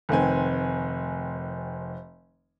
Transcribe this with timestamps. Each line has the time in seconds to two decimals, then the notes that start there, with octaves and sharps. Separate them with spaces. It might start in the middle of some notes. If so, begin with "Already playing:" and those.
0.09 F1 D#3 C4 G#5